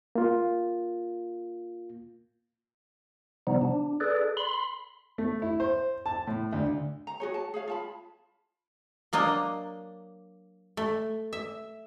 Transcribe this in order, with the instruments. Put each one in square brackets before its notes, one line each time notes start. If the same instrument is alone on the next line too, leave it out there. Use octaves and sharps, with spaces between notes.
[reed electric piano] A#3 F4
[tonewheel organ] C3 F3 G3 B3 D#4
D4
G#4 A4 B4 D5
B5 C6
[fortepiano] A3
E4
C5
A5
A2
D2
[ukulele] A#5
F#4 G#4 C#5
A5
G#4 C#5 F5
F4 A5 B5
[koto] F#3 A#3 D4 D#5
A3
E5